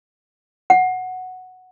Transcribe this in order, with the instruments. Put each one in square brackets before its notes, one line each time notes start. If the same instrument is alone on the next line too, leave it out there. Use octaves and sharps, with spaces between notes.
[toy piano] F#5